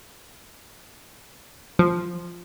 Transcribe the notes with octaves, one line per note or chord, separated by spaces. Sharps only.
F3